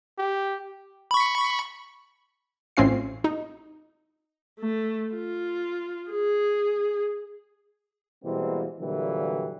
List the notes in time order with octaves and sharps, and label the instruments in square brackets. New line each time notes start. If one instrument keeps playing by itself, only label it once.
[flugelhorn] G4
[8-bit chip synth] B5 C#6
[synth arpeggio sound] A1 C4 C#4 F4 C7
D#4
[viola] A3
F4
G#4
[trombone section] B2 E3 G3 G#3 A#3 C4
A#2 D3 E3 F#3 G3